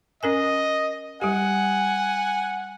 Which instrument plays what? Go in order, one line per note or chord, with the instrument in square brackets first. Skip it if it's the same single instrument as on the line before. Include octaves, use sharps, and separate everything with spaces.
[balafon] C#4 A#4 G#5 [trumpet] D#5
[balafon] G3 G4 [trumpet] F#5 [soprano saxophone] G#5